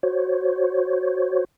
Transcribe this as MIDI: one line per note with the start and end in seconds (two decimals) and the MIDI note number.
0.03 1.45 66
0.03 1.45 72
0.03 1.45 73